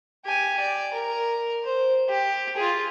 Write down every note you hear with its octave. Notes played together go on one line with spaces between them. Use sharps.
G4 G#5
D5
A#4
C5
G4
F4 G#4